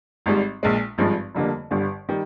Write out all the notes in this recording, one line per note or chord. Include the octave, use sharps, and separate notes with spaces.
G#1 G#2 G3
A#1 A#2 G#3
G#1 G2 F3 G#3
F1 F2 D3 G3 A#3
G1 G2 D3 G3
D#3 G3